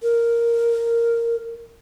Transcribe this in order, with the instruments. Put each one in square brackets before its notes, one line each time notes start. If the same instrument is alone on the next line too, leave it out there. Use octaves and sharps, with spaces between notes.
[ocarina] A#4